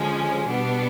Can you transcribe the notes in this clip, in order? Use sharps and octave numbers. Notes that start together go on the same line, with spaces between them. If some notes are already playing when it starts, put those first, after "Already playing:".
Already playing: D3 F3 G#3 C#4
B2 G3 B3 D4